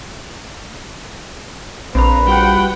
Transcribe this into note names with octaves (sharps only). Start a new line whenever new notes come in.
A#1 C4 B4 A#5
G3 F4 F#4 F#5 G5